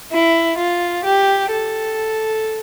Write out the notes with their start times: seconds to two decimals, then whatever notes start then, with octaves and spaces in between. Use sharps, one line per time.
0.12 E4
0.58 F4
1.04 G4
1.51 A4